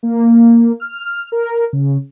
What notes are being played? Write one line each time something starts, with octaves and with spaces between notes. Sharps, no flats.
A#3
F6
A#4
C#3